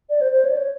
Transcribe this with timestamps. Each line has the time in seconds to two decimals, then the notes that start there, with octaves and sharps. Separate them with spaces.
0.10 D5
0.21 C5
0.32 C5
0.45 C#5
0.50 D5
0.56 C#5